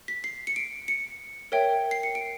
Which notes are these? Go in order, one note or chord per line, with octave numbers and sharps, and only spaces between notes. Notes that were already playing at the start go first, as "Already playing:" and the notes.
B6
C7
C#7
D7
C#7
A#4 C#5 E5 G5
C7
C#7
D7